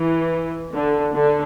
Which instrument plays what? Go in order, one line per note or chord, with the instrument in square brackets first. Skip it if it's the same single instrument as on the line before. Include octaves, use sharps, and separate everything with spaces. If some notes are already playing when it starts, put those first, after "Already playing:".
Already playing: [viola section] E3
D3
D3